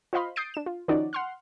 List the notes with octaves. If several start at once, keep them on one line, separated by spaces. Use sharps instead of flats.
F4 C5 D#5 F5 B5 C6
D#6 G6 A6 C7 D7
D4 E7
F4
D#3 F3 C#4 D#4 F#4 D5
F#5 C6 F6